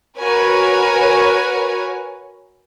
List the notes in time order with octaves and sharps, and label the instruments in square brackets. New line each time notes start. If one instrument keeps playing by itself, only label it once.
[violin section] F#4 A#4 B4 C#5 G#5